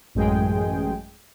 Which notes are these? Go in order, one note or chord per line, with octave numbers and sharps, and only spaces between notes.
A1 F#2 G#3 G#4 G5